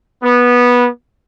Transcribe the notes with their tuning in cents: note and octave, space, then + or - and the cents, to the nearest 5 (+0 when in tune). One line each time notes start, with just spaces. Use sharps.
B3 -15